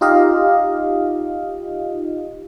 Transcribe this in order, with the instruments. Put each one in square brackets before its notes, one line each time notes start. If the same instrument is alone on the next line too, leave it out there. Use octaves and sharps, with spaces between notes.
[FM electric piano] D#4 F4 G4 D#5 F5